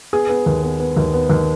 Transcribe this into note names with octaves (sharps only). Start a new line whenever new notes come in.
B3 G#4
B3
D#2
B3
B3
D#2
B3
D#2